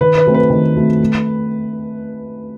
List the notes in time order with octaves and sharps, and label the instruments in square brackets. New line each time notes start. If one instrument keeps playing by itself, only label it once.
[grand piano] D#3 [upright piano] B4
[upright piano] B4
[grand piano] F#3 A3 C4
[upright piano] B4
[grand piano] D#3
F#3 A3 C4
A3